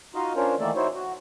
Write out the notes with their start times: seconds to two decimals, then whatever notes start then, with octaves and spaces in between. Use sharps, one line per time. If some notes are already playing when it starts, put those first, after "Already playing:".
0.15 D#4 F4 F#4 D#5 F5
0.36 C#4 D4 F4 A#4 C5 C#5
0.59 D#3 E3 A3 A#3 A4 D5
0.76 D#4 E4 F#4 C5 C#5
0.94 F#4